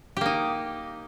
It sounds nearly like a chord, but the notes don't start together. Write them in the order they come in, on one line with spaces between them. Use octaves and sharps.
G4 A#3 D#4